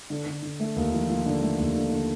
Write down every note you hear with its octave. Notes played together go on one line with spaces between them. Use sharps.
D3
D3
D3
A3
D#2
F3
F3
D3
A3
D#2
D3
D3